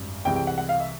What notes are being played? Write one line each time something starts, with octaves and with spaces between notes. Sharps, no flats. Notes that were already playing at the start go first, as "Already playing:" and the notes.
Already playing: G#1 F#2 G3
C2 C3 E3 G#3 G5
G5
F#5
F#5
F5
E5